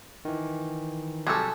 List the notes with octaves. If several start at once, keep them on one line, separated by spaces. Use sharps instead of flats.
D#3 E3
C3 F#3 G3 G#4 A4